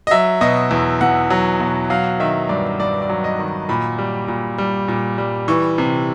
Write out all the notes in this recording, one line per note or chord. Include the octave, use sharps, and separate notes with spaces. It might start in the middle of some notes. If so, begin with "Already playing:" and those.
D#5
F#3 E5
B2 D#5
E2
E2 F#5
F#3
B2
F#3 F5
D#3 E5
G2 D5
G2 D5
D5
F#3
D#5
D#3
A#2 B5
G3
A#2
G3
A#2
G3
E3 C#6
C3